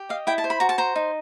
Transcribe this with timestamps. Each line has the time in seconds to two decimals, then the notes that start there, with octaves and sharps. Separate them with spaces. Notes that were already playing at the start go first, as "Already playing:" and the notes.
Already playing: G4
0.09 D#5 F5
0.27 E4 G5
0.38 A5
0.44 C5
0.50 B5
0.60 F#4 A#5
0.69 A5
0.78 C5 A#5
0.96 D#4